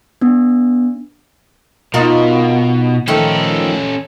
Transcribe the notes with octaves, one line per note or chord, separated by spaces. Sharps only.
B3 D4
B2 D#4 F4 A#4
D#3 F3 A3 C#4 A4